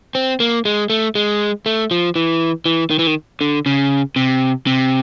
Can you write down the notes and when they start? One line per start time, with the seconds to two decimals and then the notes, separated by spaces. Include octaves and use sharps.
0.15 C4
0.40 A#3
0.65 G#3
0.90 A3
1.15 G#3
1.66 A3
1.91 F3
2.16 E3
2.66 E3
2.90 D#3
2.99 E3
3.07 D#3
3.41 D3
3.66 C#3
4.16 C3
4.67 C3